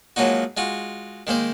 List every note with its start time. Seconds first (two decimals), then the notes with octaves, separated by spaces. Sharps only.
0.16 F3 F#3 G#3 A#3 D#4 F#4
0.57 G#3 F4 F#4
1.27 D#3 G#3 A#3 C5